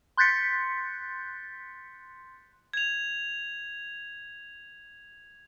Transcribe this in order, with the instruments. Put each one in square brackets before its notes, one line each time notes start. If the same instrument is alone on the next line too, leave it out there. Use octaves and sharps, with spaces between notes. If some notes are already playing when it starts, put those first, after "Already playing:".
[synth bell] C6 F#6 G6 A6 B6 C#7
[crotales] G#6 F7